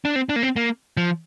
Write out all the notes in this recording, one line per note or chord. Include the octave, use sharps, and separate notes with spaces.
D4
C4
D4
A#3
C4
A#3
F3